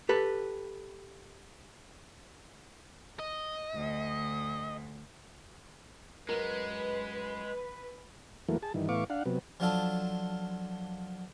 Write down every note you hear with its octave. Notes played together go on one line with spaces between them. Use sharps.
G4 A4 B4
D#5
D2
F#2 G#3 A#4 B4
E2 E3 F#3 A3 A#3
G#4 A5
G2 D#3 E3
A2 E3 B3 F5 C#6 D6
D4 F5 F#5
C3 F#3 B3
F3 F#3 D4 F4 A4